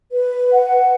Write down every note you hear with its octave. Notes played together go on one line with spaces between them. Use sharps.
B4
F#5